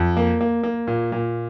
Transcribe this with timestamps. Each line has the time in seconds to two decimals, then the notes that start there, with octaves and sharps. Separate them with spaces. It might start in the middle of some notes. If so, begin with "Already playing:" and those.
Already playing: F2
0.17 A#3
0.41 A#3
0.63 A#3
0.87 A#2
1.12 A#2